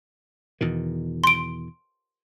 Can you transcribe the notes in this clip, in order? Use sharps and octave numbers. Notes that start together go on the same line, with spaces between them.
E2 B2 D#3
C6 D7